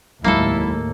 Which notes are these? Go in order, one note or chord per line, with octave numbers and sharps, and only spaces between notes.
F1 D#2 A2 F#3 G#3 A#3 E4 A4